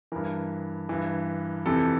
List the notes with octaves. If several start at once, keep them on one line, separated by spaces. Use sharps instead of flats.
G2 E3 A#4
G2 E3
F2 C3 E3 A4